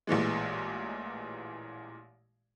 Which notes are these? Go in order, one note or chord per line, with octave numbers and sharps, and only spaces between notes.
A1 A#2 E3 G#3